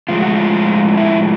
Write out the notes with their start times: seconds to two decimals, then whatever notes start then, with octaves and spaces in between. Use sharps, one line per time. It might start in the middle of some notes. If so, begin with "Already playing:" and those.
0.09 A2 F3 G#3 F4
0.22 F#4
0.35 F4
0.97 E4